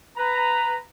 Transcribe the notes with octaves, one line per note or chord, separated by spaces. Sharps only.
B4 A#5